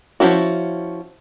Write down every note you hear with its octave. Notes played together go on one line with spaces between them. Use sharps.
F3 F#3 C#4 E4 F#4